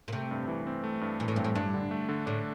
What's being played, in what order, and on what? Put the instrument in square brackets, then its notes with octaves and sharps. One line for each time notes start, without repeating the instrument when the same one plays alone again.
[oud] A#2
[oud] C3 [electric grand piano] A3
[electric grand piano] G2
E3
C4
A3
G2
[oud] A#2 [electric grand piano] E3
[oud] A2
[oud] G2 [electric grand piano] C4
[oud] A2
[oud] G2 [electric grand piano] D4
[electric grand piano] D3
A3
D3
[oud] A2 [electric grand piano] D4